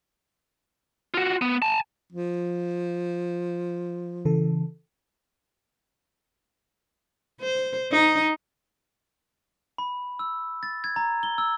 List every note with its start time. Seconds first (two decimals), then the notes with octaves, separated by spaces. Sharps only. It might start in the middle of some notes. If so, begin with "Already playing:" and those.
1.14 F4 F#4
1.42 B3
1.62 G#5 A5
2.12 F3
4.25 C#3 E3 A4
7.41 C5
7.92 D#4
9.78 B5
10.19 E6
10.63 A6
10.84 G#6
10.96 A#5
11.23 G7
11.38 E6